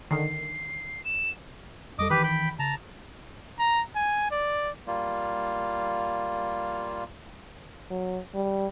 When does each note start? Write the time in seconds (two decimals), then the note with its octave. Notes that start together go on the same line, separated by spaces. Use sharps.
0.11 D3 D#3 C7
1.05 E7
1.99 F2 G3 A4 D#5 D6 D#6
2.10 D#3 E3 G4 B4 B5
2.24 G5 B5
2.59 C#3 A5 A#5
3.59 A#5
3.95 G#5
4.31 D5
4.87 G3 A#3 F4
7.91 F#3
8.35 G3